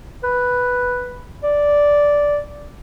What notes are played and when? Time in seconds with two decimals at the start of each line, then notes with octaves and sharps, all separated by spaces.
0.24 B4
1.43 D5